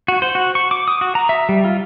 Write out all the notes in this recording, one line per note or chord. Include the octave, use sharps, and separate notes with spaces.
F#4
C5
F#4
C#6
D6
D#6
F#4
A#5
E5
G3
F4